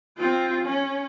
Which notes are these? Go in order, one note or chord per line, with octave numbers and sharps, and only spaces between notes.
C4 F4
C#4